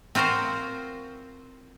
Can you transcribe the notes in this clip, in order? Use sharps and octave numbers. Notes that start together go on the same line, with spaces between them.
C4 F4 F#4 A#4 C5